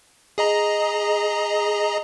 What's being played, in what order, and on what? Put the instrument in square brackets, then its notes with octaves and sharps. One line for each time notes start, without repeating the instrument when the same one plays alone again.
[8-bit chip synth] G#4 D#5 A#5